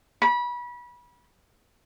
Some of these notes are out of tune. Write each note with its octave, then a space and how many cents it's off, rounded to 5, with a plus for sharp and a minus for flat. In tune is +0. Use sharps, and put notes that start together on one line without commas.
B5 -25